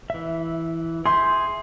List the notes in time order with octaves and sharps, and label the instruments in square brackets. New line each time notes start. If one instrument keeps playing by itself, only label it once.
[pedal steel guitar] E3 E5
[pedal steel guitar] G#4 E5 G6 [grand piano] C6